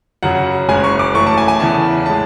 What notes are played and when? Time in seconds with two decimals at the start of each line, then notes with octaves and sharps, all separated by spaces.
0.23 F#2 C#3 F#3 F#5
0.68 F#1 F#2 C#3 G#3 G#5
0.84 C#6
0.99 D6
1.14 F#2 E3 A3 C#6
1.27 A5
1.38 G#5
1.48 G#5
1.60 E2 C#3 E3 A5
2.06 A2 G#3 A5